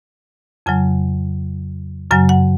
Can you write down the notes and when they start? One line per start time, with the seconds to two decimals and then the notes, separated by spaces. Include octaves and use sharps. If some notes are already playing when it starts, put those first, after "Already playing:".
0.66 F2 C#3 F#3 G#5
2.11 F#2 C#3 F#3 G#5
2.29 F#5